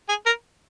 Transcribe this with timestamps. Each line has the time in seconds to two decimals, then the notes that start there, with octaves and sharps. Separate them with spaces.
0.09 G#4
0.26 A#4